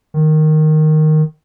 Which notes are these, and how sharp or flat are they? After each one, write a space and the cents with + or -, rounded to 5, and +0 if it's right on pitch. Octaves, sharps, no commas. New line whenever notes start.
D#3 -5